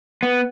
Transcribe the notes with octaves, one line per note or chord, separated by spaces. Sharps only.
B3